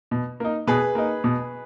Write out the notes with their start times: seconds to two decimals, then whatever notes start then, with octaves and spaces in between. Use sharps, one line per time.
0.11 B2
0.40 A#3 D#4
0.67 B2 G#4 B4
0.95 A#3 D#4
1.24 B2